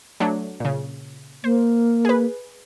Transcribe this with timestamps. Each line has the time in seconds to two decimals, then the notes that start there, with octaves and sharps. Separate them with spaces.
0.20 F#3 A3 D4
0.60 A#2 C#3
1.44 A#3 C5
2.05 G#4 B4